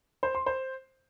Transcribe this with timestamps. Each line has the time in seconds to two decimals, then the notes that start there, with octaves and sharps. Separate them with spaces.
0.23 C5
0.35 C6
0.46 C5